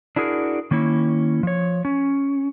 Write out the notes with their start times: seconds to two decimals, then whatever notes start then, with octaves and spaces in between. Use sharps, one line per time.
0.16 D4 E4 F#4 G#4 A#4
0.71 D#3 A#3 C#4 E4
1.43 F3 C#5
1.85 C#4